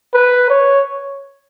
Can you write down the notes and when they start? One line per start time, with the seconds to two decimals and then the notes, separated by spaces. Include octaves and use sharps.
0.14 B4
0.50 C#5